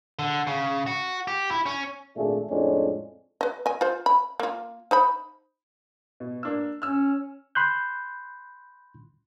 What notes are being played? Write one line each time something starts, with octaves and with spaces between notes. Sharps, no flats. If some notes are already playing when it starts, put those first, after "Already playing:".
D3
C#3
F#4
G4
E4
C#4
G#1 A#2 A3 D4 G#4
F2 A2 G#3 C#4 D4
B4 D#5
D#5 G#5
F4 C5
B5
A#3 F4
D#4 C5 B5
B2
A#3 D4 E6
C#4 E6 F6
B5 C6 F#6 G6